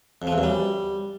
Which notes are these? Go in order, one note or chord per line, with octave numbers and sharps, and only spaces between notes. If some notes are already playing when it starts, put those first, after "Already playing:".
F2
F3
E2
F#2
G3